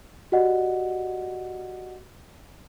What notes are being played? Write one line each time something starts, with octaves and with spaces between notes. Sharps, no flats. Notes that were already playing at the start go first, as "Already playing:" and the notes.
F#4 G4 D5 D#5 F#5